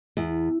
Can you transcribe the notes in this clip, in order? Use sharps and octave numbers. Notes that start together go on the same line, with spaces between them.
E2